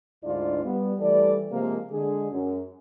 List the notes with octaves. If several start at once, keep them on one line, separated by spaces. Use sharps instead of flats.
D2 G#2 D4 E4 F4 D5
G3 B3
E3 G3 A3 A4 D5
C3 F3 G#3 A#3
D3 G#3 G#4
F#2